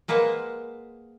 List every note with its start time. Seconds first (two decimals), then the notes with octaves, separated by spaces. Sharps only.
0.08 G#3 A#3 B4 C5 F#5